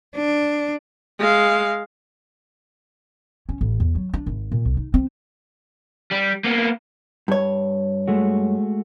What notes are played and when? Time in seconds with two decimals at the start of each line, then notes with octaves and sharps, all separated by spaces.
0.16 D4
1.19 G#3 F5
3.49 C#4
3.61 A1
3.80 E2
3.95 F#3
4.14 D4
4.26 G#1
4.52 A#2
4.65 C2
4.77 D#4
4.94 C4
6.12 G3
6.44 A#3 B3
7.28 G2 C#5
8.08 G#3 A3 F#4